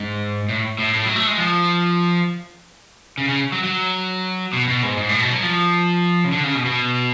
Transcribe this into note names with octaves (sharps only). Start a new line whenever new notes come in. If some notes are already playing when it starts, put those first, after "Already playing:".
Already playing: G#2
A2
A2
A2
F#3
A3
G#3
F3
C#3
C#3
F#3
F#3
B2
B2
G#2
G#2
A2
B2
F#3
F3
C#3
D3
C#3
B2
B2